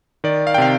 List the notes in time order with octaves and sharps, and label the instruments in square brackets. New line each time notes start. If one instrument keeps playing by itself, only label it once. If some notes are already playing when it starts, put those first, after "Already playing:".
[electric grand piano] D#3 D5
F5
G5
C3 F5